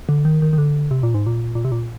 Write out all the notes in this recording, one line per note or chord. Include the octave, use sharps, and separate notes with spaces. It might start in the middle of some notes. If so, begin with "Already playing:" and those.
D3
D#3
D#3
D#3
D3
C3
A#2
G#2
A#2
A#2
C3
A#2